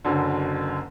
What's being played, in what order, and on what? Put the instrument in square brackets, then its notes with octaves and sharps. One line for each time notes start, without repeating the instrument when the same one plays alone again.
[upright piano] F#1 F#2 D3